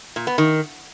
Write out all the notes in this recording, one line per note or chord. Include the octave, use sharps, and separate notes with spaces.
A#2
B3
D#3